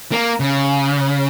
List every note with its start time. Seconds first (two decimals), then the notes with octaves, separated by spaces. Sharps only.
0.12 A#3
0.40 C#3